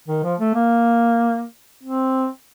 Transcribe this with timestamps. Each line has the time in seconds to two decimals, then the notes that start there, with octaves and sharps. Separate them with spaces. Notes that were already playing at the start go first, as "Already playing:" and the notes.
0.08 D#3
0.23 F3
0.40 A3
0.55 A#3
1.83 C4